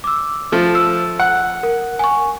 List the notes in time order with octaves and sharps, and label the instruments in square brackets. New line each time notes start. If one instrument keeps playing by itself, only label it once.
[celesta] D6 E6
[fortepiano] F3 A3
[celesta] E6
[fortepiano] F#5
[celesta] A#4
G#5 C#6